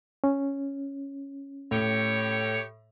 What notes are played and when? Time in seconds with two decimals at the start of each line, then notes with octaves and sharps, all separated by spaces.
0.24 C#4
1.71 A2 G4 C#5